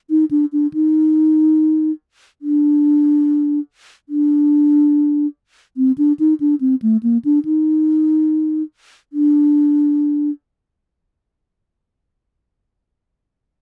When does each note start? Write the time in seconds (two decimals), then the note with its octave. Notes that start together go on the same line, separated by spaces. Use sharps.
0.10 D#4
0.31 D4
0.53 D4
0.74 D#4
2.42 D4
4.09 D4
5.77 C4
5.98 D4
6.19 D#4
6.40 D4
6.61 C4
6.82 A3
7.03 A#3
7.25 D4
7.45 D#4
9.13 D4